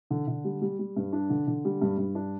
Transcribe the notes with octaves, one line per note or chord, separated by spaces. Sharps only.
D3
D3
G3
G3
G3
G2
D4
D3
D3
G3
G2
G2
D4